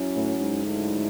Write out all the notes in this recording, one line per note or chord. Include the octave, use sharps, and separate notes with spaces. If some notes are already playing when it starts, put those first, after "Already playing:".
Already playing: F#3 C#4 E4
A2
G#2
D3 F#3 A3 C#4 E4